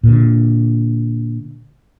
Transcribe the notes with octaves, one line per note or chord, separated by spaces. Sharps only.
A#2 D3